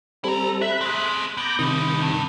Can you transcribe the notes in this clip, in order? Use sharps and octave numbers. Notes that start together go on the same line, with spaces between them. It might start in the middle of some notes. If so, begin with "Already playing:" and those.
G3 C4 E4 A4 A#5
E5 B5 F#6
C4 G#4
B3 A#5 D6 G6
C3 D#3 G3 D#4
G2